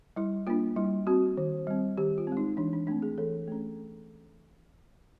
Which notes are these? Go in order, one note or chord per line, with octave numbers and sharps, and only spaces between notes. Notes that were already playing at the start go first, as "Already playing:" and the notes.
G3 E4
A#3 D4 F4
G3 E4
C4 F#4
D#3
G3 C4
D#3 G4
F4
C4
G#3 D#4
E3 D4
D4
A3 C4 D4
G#4
E3 A4
A3 C#4